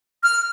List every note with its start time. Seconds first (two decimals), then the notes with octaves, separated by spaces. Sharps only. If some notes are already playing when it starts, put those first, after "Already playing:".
0.23 F6